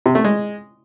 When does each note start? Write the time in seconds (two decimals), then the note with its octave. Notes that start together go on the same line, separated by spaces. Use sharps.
0.06 C3
0.15 A3
0.24 G#3